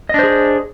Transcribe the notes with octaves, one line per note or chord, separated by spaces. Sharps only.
D4 G#4 C5 D#5